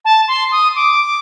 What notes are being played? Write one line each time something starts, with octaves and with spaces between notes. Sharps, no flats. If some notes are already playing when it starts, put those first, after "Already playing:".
A5
C6
D#6
D6